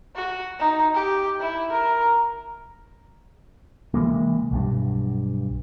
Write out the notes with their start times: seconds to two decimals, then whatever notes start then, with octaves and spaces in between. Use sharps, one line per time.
0.16 F#4
0.59 D#4
0.94 G4
1.40 E4
1.72 A#4
3.94 C3 E3 G#3 A#3
4.51 B1 G2